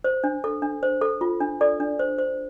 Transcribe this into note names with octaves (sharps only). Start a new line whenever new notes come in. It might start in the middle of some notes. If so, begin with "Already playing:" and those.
C5
D4
A4
D4
C5
A4
F4
D4
A4 D5
D4
C5
C5